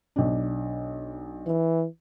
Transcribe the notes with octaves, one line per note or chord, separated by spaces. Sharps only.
B1 D4
E3